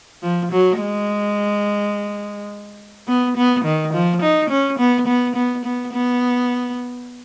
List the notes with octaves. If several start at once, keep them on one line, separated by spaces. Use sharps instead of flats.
F3
F#3
G#3
B3
B3
D#3
F3
D#4
C#4
B3
B3
B3
B3
B3